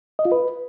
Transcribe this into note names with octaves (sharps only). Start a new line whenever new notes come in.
D#5
F4
B4